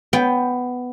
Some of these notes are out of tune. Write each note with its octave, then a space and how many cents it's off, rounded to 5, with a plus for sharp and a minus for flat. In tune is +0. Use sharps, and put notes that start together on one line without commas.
B3 +10 G5 +0